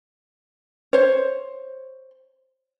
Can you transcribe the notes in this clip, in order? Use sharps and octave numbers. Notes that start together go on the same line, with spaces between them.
C5 C#5